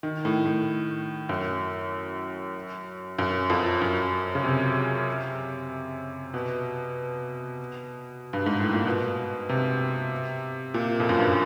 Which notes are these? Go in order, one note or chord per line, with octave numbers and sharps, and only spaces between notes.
D#3
A2
A2
F#2
F#2
F2
F#2
C#3
C3
B2
G2
G#2
A2
A#2
B2
C3
A#2
F2
F#2
G2